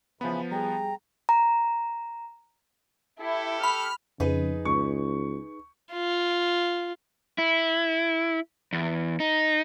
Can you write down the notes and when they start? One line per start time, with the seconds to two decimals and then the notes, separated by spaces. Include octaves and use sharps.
0.21 C#3 E3 F3 B3 B5
0.52 G3 G#4 G5 A#5
1.29 A#5
3.20 E4 G4 A4
3.64 B5 F6
4.20 F2 C#3 D#4 G#4 B4
4.65 C#2 C#6
5.92 F4
7.38 E4
8.73 E2
9.20 D#4